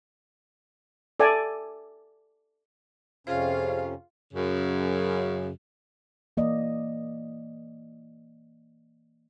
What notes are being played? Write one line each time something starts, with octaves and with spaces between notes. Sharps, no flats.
A4 D5 E5 G#5 A5
F2 C3 C#4 F4 G#4 C5 F5
F#2 C#3
E3 A#3 D5 D#5